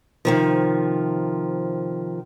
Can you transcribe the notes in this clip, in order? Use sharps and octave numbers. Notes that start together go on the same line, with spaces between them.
C3 D#3 F3